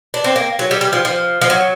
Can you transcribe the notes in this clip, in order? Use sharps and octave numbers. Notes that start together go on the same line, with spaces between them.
D4
C4
A#3
F#3
G3
G3
F3
F3
F3
F#3